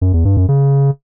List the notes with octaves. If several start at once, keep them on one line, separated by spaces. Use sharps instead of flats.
F#2
E2
G2
F#2
C#3